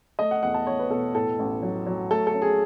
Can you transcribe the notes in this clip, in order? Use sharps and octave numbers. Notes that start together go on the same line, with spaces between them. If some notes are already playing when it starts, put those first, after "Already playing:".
A3 D#5
F#5
E2 F#5
A5
E2 C#5
B4
B2 A4
A2 A4
A1
F#3
F#3
A3 A4
A4
C#4
G#4